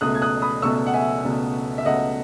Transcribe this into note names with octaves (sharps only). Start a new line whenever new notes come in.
C#2 B2 A3 D#6 F#6
G#6
D#6 F#6
B5 D#6
C#2 B2 A3 C#6 E6
F#5
E5 G#5
C#2 B2 A3
E5
C#2 B2 A3 D#5 F#5